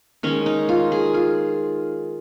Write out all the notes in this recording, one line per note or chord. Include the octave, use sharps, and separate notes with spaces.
D#3 G#3 C#4
D#4
F4
G#4
F4